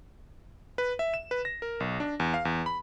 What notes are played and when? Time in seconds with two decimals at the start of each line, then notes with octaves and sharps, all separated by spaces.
0.78 B4
0.99 E5
1.14 E7
1.31 B4
1.45 A#6
1.62 A#4
1.80 B1
2.00 D4
2.20 E2
2.34 F5
2.45 E2
2.66 B5